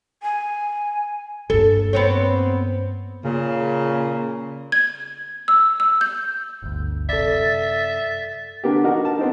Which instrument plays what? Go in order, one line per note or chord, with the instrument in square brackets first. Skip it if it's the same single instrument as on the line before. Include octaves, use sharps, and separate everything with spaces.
[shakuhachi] G#5
[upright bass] G2 A#3 [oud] A4
[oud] B3 C4 C#5
[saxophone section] A#2 C#3
[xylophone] G#6
E6
E6
G6
[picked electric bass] G1 D2
[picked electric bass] F#2 C3 [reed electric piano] A4 D5 [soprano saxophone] E5 [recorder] A6
[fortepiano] D3 A#3 B3 D4 G4
D4 D#4 F#4 A#4
A5
B3 C4 D#4